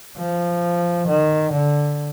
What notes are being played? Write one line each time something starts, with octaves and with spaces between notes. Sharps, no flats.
F3
D#3
D3